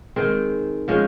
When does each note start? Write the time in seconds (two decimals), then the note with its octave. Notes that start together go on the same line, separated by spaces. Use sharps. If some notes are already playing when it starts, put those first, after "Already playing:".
0.16 D#3 G#3 C4
0.88 F3 G#3 C#4